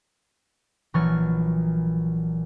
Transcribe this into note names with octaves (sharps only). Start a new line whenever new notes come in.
A#1 E3 F#3 C#6 F6 A6